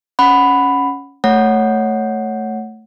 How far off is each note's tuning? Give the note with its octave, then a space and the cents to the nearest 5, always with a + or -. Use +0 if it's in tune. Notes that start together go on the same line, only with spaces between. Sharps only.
C#4 +5 F#5 +0 B5 +10
A3 +0 C#5 +0 F#5 +0